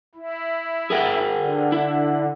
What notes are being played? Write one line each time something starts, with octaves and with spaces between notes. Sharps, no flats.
E4
G#4 A#4 G5
D3
E4